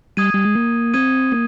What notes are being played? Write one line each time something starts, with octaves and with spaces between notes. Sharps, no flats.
G3 D#6 G#6 D#7
G3
G#3
A#3
C4 D#6 G#6 D#7
A#3